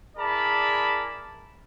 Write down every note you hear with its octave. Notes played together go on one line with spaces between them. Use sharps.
E4 G#4 A#4 D5 A5 B5